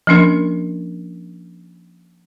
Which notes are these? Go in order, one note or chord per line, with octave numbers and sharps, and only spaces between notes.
F3 A#3 C#4 D4 A#4